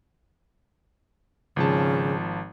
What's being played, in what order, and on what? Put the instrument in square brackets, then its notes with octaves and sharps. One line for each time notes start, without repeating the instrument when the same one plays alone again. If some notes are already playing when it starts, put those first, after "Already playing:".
[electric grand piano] G#1 F3 A5 [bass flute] C#3